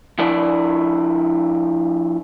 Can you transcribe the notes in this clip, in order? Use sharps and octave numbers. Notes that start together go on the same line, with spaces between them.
F3 D4 E4 A#4 D5